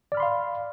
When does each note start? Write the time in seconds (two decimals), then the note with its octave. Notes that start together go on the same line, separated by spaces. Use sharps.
0.12 D5
0.15 F6
0.17 B5
0.20 C6
0.23 F5